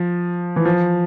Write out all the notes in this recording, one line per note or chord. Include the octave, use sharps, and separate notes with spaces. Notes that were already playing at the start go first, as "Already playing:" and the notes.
Already playing: F3
E3
F3